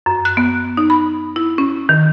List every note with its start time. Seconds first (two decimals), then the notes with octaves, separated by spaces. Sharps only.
0.06 F#2
0.25 F#6
0.37 B3
0.77 D#4
0.90 B5
1.36 E4
1.58 C#4
1.89 D#3